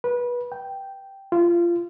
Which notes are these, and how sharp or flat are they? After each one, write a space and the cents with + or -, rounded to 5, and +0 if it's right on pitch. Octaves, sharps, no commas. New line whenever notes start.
B4 -25
G5 -5
F4 -25